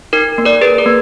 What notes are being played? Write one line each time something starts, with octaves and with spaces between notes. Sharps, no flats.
D#4 A#4
A#3
A#4 D5
G#4 B4
A#4
A#3